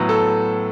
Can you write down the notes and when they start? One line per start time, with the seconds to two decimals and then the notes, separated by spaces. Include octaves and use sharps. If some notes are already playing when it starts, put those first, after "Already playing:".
Already playing: A2 F#3 B3
0.09 A4